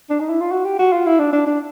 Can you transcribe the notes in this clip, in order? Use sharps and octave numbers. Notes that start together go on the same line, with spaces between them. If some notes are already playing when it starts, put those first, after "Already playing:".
D4
D#4
E4
F4
F#4
G4
F#4
F4
E4
D4
D4
D4